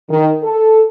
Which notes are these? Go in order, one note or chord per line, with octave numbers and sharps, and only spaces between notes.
D#3
A4